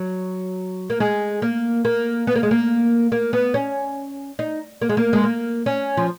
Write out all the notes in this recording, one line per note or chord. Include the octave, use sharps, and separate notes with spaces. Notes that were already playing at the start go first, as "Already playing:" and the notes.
Already playing: F#3
A#3
G#3
A#3
A#3
B3
A#3
G#3
A#3
A#3
B3
C#4
D#4
A#3
G#3
A#3
G#3
A#3
C#4
F3